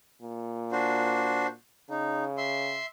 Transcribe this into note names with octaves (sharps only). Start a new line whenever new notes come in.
A#2
D4 F#4 C5
C#3 D#4
E5 C6